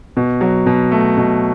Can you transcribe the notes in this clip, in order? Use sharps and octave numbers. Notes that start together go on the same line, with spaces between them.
B2
F#3
B2
A3
B2